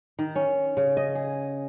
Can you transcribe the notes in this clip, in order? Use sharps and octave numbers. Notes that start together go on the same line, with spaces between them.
D#3
C#4
C#3
D#5
G#4